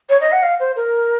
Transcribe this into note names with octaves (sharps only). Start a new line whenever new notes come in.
C#5
D#5
F#5
F5
C5
A#4